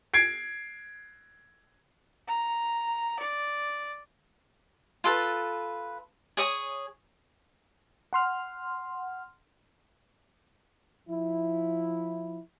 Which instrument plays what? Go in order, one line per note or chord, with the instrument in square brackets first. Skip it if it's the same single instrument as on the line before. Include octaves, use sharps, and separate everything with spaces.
[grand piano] G#6 C7 D7
[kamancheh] A#5
D5
[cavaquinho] F4 A4 B4
G#4 C#5 D#6
[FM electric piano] F#5 C6 F6
[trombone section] F3 E4